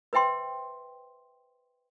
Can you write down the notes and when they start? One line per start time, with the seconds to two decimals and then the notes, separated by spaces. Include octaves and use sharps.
0.13 B4 C5 E5 G5 C6